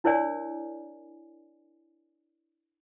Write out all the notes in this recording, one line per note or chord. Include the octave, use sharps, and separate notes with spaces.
D4 E4 A#4 C#5 D5 G#5